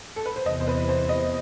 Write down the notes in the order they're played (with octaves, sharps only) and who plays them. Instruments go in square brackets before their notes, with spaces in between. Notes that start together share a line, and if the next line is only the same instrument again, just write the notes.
[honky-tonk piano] A4
B4
C5
[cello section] E2 C3 E3 [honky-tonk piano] D#5
[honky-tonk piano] C5
B4
C5
D#5